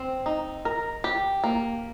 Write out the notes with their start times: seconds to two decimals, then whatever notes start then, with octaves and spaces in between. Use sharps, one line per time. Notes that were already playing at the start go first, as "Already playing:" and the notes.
Already playing: C4
0.26 D#4
0.65 A#4
1.04 G4
1.44 A#3